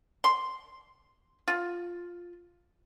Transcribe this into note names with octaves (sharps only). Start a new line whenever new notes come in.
C6
F4